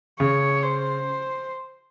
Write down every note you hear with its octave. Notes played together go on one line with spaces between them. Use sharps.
C#3 C#5
C5